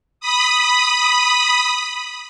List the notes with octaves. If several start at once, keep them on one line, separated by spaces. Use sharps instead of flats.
B5 D#6